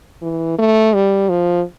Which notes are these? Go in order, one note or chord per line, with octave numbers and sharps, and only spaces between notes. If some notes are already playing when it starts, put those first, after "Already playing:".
E3
A3
G3
F3